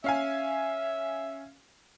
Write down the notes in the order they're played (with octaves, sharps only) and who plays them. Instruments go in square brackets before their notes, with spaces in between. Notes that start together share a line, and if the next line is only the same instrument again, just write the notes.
[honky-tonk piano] C#4 F5 G#5 [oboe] E5